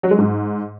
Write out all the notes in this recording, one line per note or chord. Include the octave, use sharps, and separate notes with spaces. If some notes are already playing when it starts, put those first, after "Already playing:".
F#3
G#3
G#2